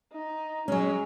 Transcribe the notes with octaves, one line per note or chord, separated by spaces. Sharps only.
D#4
F#3 G#3 C#4